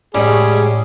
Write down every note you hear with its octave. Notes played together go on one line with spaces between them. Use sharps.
A2 G3 G#3 C#4 G#4